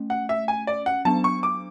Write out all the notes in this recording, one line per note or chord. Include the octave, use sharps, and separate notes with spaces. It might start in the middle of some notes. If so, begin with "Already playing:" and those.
Already playing: A3 C#4
F#5
E5
G#5
D5
F#5
F#3 B3 D4 A5
C#6
D6